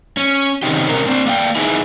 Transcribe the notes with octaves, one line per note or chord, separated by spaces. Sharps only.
C#4
C3 D#3 C4 C#4 D#4 G4
C3 C#4 A#4
C4 D4
A#3 D5 F5 G5
D#4 E4 G#4 B4